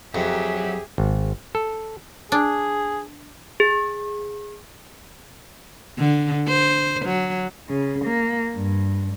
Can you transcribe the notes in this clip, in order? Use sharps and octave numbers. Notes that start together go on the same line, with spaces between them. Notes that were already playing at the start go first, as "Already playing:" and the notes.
F2 F#3 G4 G#4 E5
G#1
A4
D4 G#4
G#4
D3
C5
F#3
C#3
A#3
G2